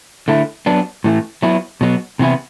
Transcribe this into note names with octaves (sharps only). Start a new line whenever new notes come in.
D3 A3 E4
F#3 B3 D4
A2 E3 A3
F#3 B3 E4
B2 F#3 B3
C3 E3 B3 E4